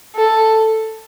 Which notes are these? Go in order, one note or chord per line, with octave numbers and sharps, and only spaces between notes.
A4